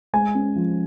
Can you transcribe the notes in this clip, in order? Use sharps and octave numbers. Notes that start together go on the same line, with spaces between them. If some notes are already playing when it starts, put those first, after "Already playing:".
G#3 G#5
C#4
F3